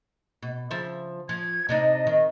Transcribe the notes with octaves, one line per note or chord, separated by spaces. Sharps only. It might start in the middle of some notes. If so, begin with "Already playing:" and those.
B2
C#3 F3 E5
F3 G#6
C3 D4 D#4 D#5
D#3